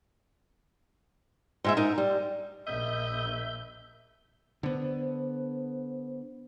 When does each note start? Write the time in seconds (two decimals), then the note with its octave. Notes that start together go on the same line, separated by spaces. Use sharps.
1.64 G#2 G#3 E5
1.77 G#2 D#4 A#4
1.98 G3
2.67 A#1 D#5 E5 G6
4.63 D3 B3 C5